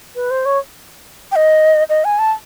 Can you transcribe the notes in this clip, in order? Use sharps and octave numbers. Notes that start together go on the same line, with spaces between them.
B4
C5
C#5
G5
D#5
D#5
G#5
A5